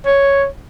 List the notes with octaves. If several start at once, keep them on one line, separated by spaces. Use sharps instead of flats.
C#5